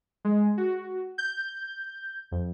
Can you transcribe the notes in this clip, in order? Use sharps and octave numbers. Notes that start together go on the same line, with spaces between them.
G#3
F#4
G6
F2